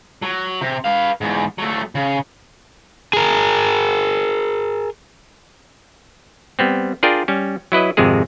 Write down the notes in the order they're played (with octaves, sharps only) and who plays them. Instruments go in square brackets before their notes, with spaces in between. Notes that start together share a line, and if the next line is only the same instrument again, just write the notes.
[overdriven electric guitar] F#3
C3
B4 F5
E2 G#2
F#3 A3
C#3
G#4 A#4
[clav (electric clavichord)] G3 B3 C4
D4 F4 G#4 A#4 D5 G5
G3 C#4
F#3 E4 B4 D#5
G#1 F2 C3 G#3 G#4